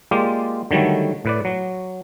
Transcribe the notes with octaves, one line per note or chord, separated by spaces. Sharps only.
G#3 A#3 F4 G4 D5
D3 D#3 F#3 G3 A3
A2 B4 D5
F#3